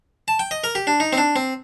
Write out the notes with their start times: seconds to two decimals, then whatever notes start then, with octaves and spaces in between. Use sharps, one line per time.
0.28 A5
0.39 G5
0.51 D#5
0.64 A#4
0.75 G4
0.87 D4
1.00 D#4
1.13 C4
1.18 D4
1.36 C4